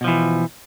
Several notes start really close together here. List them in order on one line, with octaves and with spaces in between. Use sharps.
B2 F3 E3